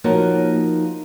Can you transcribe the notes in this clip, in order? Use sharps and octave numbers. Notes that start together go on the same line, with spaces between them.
F3 A#3 D#4 F#4 A#4 C#5